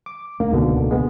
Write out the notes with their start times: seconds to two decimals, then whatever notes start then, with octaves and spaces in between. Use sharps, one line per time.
0.06 D6
0.40 D#1 A3 A#3 D4
0.52 D1 C#2 G#2 B2 D3 A#3
0.91 G#3 B3